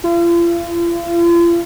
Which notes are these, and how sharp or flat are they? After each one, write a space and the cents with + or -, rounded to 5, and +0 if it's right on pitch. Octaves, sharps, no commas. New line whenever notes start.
F4 -40